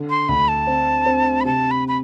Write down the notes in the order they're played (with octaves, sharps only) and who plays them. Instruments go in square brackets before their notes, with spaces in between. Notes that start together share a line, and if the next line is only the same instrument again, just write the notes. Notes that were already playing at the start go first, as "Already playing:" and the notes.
Already playing: [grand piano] D3
[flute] C6
[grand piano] D2 [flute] B5
[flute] A5
[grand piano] C4
C4
[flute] B5
[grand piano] C3 [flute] A5
[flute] B5
B5